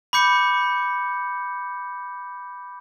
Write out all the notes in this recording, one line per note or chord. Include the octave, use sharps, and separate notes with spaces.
B5 D6 G6 C#7